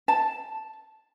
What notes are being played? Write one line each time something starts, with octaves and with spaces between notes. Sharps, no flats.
A5